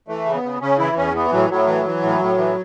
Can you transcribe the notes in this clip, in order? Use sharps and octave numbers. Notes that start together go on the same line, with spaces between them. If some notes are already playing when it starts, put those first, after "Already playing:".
E3 A3
C#3
B3
C#3
C#3 C#4
E3 E4
E2 C#4
E3 B3
A2 F#3
A2 F#3
E3
E3
A2
A2
E3